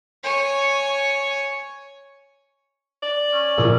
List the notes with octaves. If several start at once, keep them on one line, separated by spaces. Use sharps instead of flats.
C#5 G#5
D5
C#4
A#1 C#3 A#4 D6 E6